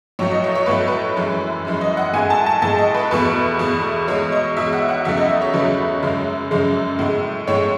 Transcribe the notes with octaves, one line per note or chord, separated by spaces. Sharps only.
A2 F#3 A3 C#5
D#5
C#5
C#5
A2 F#3 A3 B4
B4
F#2 E3 G#3
F#2 E3 G#3
D#5
F#5
A2 G#3 G#5
A5
A5
A2 G#3 A5
D#5
B4
E2 B2 A3 B4
E2 B2 A3
E2 B2 G#3 C#5
D#5
E2 B2 G#3 E5
F#5
F#5
E2 C#3 F#3 A3 E5
D#5
D#5
C#5
E2 C#3 F#3 A3 B4
F#2 C#3 G#3
F#2 C#3 G#3
A2 G#3
A2 G#3 C#5